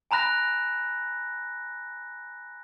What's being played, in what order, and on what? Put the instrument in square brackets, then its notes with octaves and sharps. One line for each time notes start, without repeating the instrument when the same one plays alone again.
[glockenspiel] G#5 A#5 B5 F#6 A#6